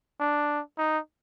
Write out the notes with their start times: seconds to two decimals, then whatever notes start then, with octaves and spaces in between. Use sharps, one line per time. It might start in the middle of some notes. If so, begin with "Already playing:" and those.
0.20 D4
0.78 D#4